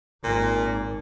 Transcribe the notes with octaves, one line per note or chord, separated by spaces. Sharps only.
G#1 A#2